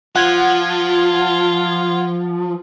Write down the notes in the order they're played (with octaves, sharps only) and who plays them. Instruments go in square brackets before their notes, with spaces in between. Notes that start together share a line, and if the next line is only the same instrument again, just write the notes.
[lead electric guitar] F3 [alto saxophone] F4 [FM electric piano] F#5 G#6